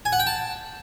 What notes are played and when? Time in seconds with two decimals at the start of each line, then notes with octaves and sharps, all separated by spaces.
0.05 G#5
0.12 F#5
0.19 G5
0.27 A5